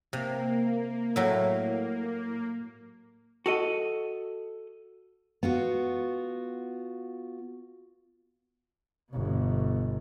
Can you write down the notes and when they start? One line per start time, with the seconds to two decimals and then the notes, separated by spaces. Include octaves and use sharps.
0.13 C3 A#3
1.16 A2 F#3 E4
3.46 F#4 A4 D#5
5.43 B3 F4 F#4
9.10 G1 B2